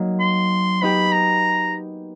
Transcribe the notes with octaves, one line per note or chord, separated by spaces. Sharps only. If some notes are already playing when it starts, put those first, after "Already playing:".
Already playing: F#3 A#3 D#4
C6
B3 D#4 G4 B5
A#5